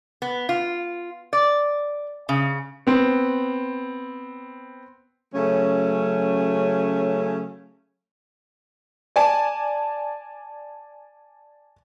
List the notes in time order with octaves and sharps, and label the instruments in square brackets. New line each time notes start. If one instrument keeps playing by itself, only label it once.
[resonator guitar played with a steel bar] B3
F4
D5
C#3
[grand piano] B3 C4
[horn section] C#3 F#3 A3 C#4
[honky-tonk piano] D5 G#5 A5